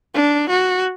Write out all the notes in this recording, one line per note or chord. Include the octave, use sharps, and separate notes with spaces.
D4
F#4